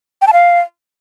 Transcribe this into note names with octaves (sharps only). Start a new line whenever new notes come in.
G5
A5
F5